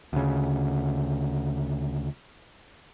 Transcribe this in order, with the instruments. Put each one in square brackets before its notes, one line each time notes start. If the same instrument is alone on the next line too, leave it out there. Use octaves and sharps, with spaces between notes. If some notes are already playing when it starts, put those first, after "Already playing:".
[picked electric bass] D2 C#3